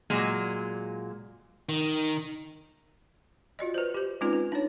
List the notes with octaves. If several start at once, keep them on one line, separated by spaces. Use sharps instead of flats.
A#2 F#3 G#3
D#3
F4 F#4 D5 D#5
B4 C5
G4 C5
G#3 C4 C#4 D#4 F4 B4
B4
D4 D#4 C#5